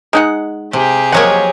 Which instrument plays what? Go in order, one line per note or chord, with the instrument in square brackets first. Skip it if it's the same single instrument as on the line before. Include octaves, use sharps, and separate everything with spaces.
[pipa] G#3 D#4 F#5
[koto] C3 [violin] G4 G#4
[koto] F3 F#3 C#5 [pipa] A#3 D#5 F#5